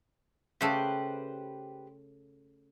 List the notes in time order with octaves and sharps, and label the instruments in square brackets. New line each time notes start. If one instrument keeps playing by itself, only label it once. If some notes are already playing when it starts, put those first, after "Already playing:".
[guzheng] C#3 A3 A4 [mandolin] G4 B4 C5